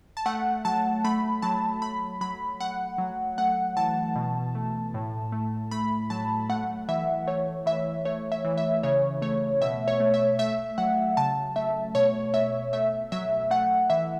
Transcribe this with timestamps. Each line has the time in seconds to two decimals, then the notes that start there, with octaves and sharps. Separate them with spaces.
0.17 A5
0.26 A3 F#5
0.65 F#3 A5
1.04 A3 B5
1.42 F#3 A5
1.82 A3 B5
2.21 F#3 B5
2.60 A3 F#5
2.98 F#3
3.38 A3 F#5
3.77 E3 A5
4.16 B2
4.55 A3
4.94 A2
5.32 A3
5.71 A3 B5
6.10 F#3 A5
6.49 A3 F#5
6.88 E3 E5
7.27 A3 C#5
7.66 E3 E5
8.05 A3 C#5
8.32 E5
8.44 E3
8.58 E5
8.83 C#3 C#5
9.22 A3 C#5
9.61 B2 E5
9.88 C#5
10.00 A3
10.14 E5
10.39 A3 E5
10.78 F#3 F#5
11.17 C#3 A5
11.56 A3 E5
11.95 B2 C#5
12.34 A3 E5
12.73 A3 E5
13.12 F#3 E5
13.50 A3 F#5
13.90 E3 E5